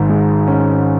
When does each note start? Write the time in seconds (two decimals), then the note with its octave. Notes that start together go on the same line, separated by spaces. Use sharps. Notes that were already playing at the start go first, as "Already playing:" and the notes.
Already playing: G#1 G#2
0.09 G#3
0.48 C#4